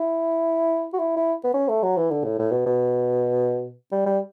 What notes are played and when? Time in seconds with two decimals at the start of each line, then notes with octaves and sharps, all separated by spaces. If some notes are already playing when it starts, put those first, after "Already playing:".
Already playing: E4
0.93 F#4
0.99 E4
1.17 E4
1.44 B3
1.54 C#4
1.68 A3
1.83 F#3
1.97 E3
2.11 D3
2.24 A2
2.39 A2
2.52 B2
2.66 B2
3.92 G3
4.06 G3